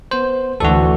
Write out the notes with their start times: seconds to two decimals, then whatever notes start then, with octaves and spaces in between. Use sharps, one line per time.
0.11 B3 C5
0.60 D2 E3 F#4 A4